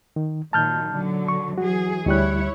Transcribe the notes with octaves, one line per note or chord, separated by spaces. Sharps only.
D#3
A#2 D#3 F#3 A5 F6 G6
D3 F#3
C#6
E3 F#3 F#4 G#4
D2 G3 E4 C#5 F#6